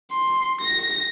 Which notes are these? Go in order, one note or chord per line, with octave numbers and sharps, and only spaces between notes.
C6
A#6